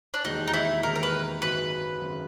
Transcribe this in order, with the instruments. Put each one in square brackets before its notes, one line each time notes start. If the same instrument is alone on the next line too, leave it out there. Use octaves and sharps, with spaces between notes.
[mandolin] D4
[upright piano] E1 D#2 D#3 G#3 [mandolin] D#4
[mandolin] D#4
E4
[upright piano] E1 D#2 D#3 G#3 [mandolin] A#4
[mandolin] A#4
B4
[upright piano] G#1 F#2 C#3 F#3 [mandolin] B4
[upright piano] G#1 F#2 C#3 F#3